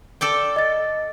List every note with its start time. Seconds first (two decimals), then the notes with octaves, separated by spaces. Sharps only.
0.21 A4 D5 G5
0.56 D#5 A6